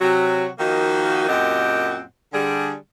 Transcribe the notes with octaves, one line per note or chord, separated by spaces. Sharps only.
C3 F#3 F#4
D#3 F3 A#3 D#4 F#4
F#2 A#2 C4 G4 D#5 F#5
D3 G3 G#4